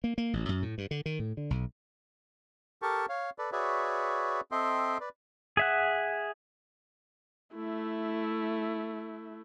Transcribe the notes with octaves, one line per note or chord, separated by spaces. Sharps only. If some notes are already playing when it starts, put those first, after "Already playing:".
A#3
A#3
A1
F#2
A2
G2
D3
D#3
A2
D3
B1
G4 A4 A#4 A5 C#6
C#5 F5
A4 B4 D5
F#4 G#4 B4 C#5 D5 E5
C4 A4 D#5 E5 G5 C6
B4 D5
G#4 E5 F#5
A3 E4